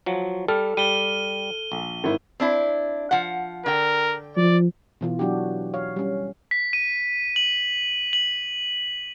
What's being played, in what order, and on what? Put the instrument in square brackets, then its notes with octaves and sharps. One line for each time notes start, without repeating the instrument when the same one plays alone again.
[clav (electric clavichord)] F3 F#3
[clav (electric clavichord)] G3 [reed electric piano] A4 [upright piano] F6
[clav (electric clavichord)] G3 [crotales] D#7 G7
[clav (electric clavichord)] A#1
[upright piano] G#1 E4
[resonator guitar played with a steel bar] C4 D4 E4
F3 F#5
[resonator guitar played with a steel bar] D3 G5 [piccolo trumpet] A#4
[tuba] F3 [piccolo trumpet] D5
[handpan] B2 E3 F4
F#3 D4 F#4 G4
C#5 F5
G3 C#4
[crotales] B6
D#7
F#7
F#7